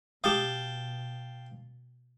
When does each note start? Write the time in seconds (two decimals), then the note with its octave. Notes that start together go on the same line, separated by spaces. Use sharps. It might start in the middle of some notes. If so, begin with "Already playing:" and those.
0.24 B2 G4 F5 G5 A5 D#6